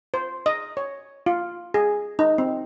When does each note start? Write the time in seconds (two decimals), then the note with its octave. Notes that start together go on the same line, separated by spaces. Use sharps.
0.14 C5
0.46 D#5
0.77 C#5
1.26 F4
1.74 G#4
2.19 D#4
2.38 C4